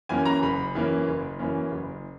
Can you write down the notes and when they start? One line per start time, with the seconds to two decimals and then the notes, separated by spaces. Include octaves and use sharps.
0.09 F#2 E3 A#3 C#4 G#5
0.25 A#5
0.42 F#1 B5
0.75 F#2 E3 A#3 C#4
1.08 F#1
1.39 F#2 E3 A#3 C#4
1.71 F#1